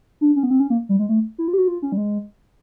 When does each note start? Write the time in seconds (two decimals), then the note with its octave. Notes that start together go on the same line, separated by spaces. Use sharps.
0.21 D4
0.36 C#4
0.43 B3
0.51 C4
0.60 C#4
0.70 A#3
0.89 G3
0.99 G#3
1.09 A3
1.38 E4
1.48 F4
1.53 G4
1.58 F#4
1.68 F4
1.82 C#4
1.92 G3
1.97 G#3